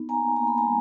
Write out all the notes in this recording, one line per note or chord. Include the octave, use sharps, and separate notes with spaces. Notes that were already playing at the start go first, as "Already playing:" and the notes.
Already playing: B3 D#4
A#3 G#5 A#5
A#3 A#5
B5
G#5 A#5
G3